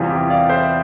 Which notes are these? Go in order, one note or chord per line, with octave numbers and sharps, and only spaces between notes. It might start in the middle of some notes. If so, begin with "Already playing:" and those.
Already playing: E2 C3 E3 G3 F4
E4 G4
D5 F5
C5 E5